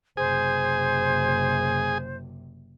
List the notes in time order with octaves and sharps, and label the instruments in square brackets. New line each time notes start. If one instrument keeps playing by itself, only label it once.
[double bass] F#1 C3 [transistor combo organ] G#4 G#5 [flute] C5